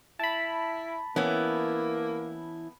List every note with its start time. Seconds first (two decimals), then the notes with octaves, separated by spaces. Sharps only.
0.19 E4 A5 B5
1.16 E3 A#3 B3 C#4 E4